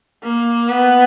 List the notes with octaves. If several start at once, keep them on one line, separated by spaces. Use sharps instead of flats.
A#3
B3